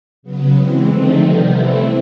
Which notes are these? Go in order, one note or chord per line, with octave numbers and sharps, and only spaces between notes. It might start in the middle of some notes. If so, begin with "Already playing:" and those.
C#3 F#3 B3
E3 G#3 C4
D3 F3 A3 C4 D#4
C3 D#3 G3 B3
E3 A3 C4 E4